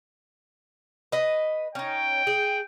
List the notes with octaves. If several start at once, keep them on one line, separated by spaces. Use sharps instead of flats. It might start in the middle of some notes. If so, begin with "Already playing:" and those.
B4 D#5
C#4 D#4 G5
G#4